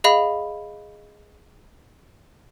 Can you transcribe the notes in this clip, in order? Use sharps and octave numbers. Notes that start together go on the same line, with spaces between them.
G#4 D#5 F5 B5